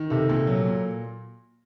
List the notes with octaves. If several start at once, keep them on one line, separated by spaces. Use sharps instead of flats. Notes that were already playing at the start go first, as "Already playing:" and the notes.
Already playing: D#3
C3 A4
A#2 A4
F#3
A#2